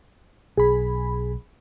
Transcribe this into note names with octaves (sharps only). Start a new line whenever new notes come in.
B1 G#4 B5